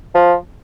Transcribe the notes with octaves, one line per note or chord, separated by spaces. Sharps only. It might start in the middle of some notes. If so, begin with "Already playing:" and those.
F3